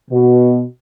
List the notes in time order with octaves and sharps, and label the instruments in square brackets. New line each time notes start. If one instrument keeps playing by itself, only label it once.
[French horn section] B2